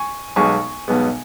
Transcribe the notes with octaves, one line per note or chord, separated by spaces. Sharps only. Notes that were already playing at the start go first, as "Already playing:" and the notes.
Already playing: G#5 C#6
B1 B2 G#3 B3 G#5 C#6
B1 B2 G#3 B3